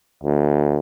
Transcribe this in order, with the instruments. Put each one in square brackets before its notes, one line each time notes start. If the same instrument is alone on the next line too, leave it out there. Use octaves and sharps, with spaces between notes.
[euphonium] D2